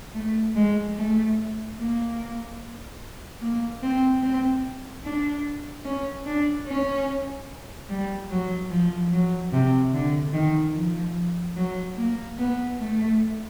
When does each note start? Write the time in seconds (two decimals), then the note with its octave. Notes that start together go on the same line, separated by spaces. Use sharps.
0.15 A3
0.56 G#3
0.97 A3
1.79 A#3
3.42 A#3
3.83 C4
4.23 C4
5.04 D4
5.85 C#4
6.26 D4
6.67 C#4
7.90 G3
8.31 F#3
8.70 F3
9.12 F#3
9.53 C3
9.94 D3
10.34 D#3
10.75 F3
11.57 F#3
11.98 A#3
12.38 B3
12.79 A3